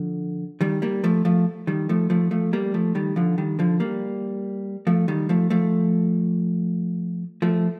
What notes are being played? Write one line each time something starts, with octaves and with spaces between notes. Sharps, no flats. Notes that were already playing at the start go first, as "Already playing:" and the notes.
Already playing: D3 F3
D#3 G3
G3 A#3
F3 A3
F3 A3
D#3 G3
F3 A3
F3 A3
F3 A3
G3 A#3
F3 A3
D#3 G3
D3 F3
D#3 G3
D3 F3
G3 A#3
F3 A3
D#3 G3
F3 A3
F3 A3
F3 A3